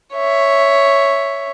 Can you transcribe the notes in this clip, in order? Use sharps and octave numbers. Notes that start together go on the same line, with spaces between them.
C#5 E5